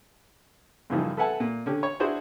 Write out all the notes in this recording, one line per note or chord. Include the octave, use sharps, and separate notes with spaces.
F#2 C#3 E3 F3 G3 D#4
A4 B4 E5 F#5 G#5 A5
A#2
D3 C#4 G4
C#5
D4 E4 F#4 G#4 C5